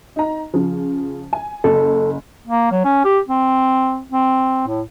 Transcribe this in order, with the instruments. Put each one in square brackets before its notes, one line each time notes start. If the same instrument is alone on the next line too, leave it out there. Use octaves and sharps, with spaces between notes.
[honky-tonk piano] D#4 A#5
C#3 F3
G#5
[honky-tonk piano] F#1 [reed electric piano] A4
[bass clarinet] A#3
F#3
C#4
G4
C4
C4
A2